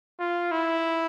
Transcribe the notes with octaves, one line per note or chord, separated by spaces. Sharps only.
F4
E4